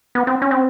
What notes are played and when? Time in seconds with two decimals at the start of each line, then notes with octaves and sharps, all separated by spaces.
0.15 B3
0.27 C4
0.42 C#4
0.51 C4